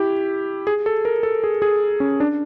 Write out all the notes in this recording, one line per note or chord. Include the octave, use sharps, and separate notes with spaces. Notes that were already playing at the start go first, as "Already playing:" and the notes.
Already playing: E4 G4
G#4
A4
A#4
A4
G#4
G#4
C#4
D4